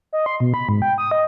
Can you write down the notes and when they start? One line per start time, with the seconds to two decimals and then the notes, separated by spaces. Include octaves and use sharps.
0.13 D#5
0.26 C6
0.40 B2
0.54 B5
0.69 G#2
0.82 G5
0.98 D#6
1.11 D#5